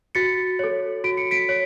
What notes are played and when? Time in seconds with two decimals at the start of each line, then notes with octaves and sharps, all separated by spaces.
0.15 F#4 A6 C#7
0.59 A4 C#5
1.04 F#4 D7
1.17 C#7
1.31 B6 D7
1.49 C#5